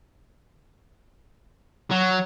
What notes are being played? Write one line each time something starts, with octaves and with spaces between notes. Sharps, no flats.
F#3